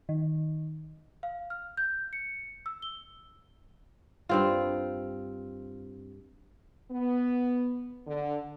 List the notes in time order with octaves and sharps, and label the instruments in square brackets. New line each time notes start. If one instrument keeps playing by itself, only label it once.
[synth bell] D#3
[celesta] F5
F6
G6
C#7
E6
G7
[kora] G2 C4 F4
[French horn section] B3
D3